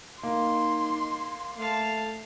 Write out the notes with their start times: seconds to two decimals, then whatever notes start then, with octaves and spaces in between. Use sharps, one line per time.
0.23 A#3 D#4 C6
1.58 A3 F5 A5